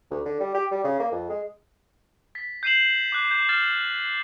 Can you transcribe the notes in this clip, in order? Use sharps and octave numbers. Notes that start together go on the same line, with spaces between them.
D2
D3
G3
G4
G3
C#3
A#3
F2
G#3
A6 B6
G6 C7 D#7 E7 F#7
D6 F#6
G6
F6 A6 E7